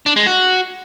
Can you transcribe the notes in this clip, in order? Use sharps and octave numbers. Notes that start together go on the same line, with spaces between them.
D4
G#3
F#4